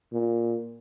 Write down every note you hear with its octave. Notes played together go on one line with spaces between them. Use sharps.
A#2